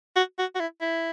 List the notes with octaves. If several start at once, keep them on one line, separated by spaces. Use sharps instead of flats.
F#4
F#4
F#4
E4
E4